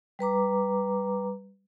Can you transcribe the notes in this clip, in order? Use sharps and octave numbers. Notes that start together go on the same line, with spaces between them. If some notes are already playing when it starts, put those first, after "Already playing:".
G3 B4 A#5 D6